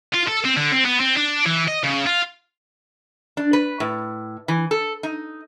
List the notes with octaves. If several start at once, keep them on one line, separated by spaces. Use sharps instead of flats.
F4
A4
C4
D3
C4
B3
C4
D4
E3
D#5
C#3
F4
D4
B4
A2
E3
A4
D#4